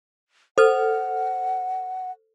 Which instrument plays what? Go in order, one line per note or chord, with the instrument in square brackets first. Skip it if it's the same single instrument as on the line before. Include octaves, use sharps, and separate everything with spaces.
[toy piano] A4 [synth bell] C5 F6 [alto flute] F#5